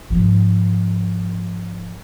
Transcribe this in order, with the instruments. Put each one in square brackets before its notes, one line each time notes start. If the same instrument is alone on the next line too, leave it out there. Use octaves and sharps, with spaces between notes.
[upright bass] G#2 F3